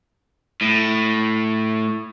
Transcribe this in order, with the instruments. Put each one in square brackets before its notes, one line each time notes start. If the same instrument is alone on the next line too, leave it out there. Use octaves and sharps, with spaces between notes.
[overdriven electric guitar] A2